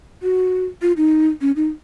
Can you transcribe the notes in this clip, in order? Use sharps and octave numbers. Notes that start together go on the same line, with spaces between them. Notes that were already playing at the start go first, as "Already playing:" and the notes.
F#4
F4
D#4
C#4
D#4